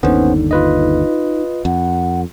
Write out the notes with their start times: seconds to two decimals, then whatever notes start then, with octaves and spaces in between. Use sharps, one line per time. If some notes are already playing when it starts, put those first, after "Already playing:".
0.03 G1 D#2 D3 B3 C#4 D#4 C5
0.51 F4 B4 D#5
1.65 F2 F#5